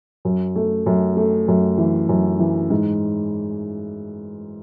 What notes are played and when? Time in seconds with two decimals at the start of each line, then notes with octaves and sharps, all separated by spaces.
0.25 F#2
0.56 A3
0.86 F#2
1.17 A3
1.48 F#2
1.78 E3
2.09 F#2
2.39 E3
2.70 G#2